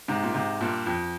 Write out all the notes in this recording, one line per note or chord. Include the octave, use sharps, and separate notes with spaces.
G#2 C3
A#2
G#2 C3
G2 A#2
F2